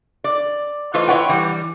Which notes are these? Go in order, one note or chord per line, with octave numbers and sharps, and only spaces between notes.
D5
E3 A3 F4 B4 C5 D#5
E4 B4 C#5 F#5 G5
E3 G3